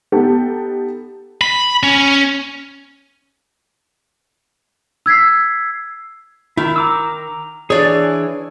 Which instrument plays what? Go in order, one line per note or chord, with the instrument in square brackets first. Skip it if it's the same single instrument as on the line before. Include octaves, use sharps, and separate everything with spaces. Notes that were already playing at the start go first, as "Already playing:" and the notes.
[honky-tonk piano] B3 D#4 G4 A4
[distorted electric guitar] B5
C#4
[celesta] E6 G#6 B6 C7
[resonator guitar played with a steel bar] D#3 [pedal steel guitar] E4
[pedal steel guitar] A#5 D6 E6
[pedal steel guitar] E3 D4 G#4 [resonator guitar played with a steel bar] C#5 D5